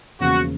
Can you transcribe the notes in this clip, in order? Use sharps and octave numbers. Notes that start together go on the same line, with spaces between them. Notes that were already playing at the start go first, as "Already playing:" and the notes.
E1 E2 C#3 F3 A#3 F#4